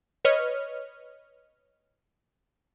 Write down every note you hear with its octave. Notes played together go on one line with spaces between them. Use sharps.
B4 C#5 D#5 F6